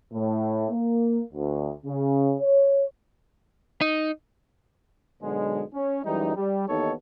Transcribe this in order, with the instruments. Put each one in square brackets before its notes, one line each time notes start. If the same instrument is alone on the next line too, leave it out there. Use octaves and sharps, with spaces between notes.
[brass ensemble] A2
A#3
D2
C#3
C#5
[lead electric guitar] D#4
[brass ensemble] G#2 B2 D3 F#3 G#3
C#4
F#2 E3 G3 G#3 D#4
G3
D#2 E3 B3 D#4 A4 C#5